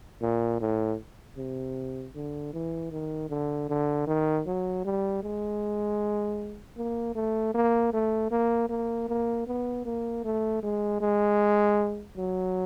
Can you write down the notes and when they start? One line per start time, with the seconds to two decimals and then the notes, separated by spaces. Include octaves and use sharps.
0.21 A#2
0.60 A2
1.37 C3
2.15 D3
2.53 E3
2.92 D#3
3.30 D3
3.69 D3
4.07 D#3
4.46 F#3
4.85 G3
5.23 G#3
6.77 A#3
7.15 A3
7.54 A#3
7.93 A3
8.31 A#3
8.70 A#3
9.08 A#3
9.47 B3
9.85 A#3
10.24 A3
10.63 G#3
11.00 G#3
12.17 F#3